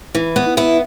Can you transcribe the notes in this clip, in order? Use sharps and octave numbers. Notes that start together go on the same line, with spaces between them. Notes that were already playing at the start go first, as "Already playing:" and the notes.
E3
B3
B3 E4